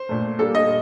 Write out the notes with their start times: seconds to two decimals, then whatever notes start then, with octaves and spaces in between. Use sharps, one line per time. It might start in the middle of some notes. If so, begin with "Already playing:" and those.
Already playing: C5
0.09 A#2 A3
0.39 A#2 G3 A#3 A4
0.55 D#5